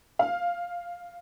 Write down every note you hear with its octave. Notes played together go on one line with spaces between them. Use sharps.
F5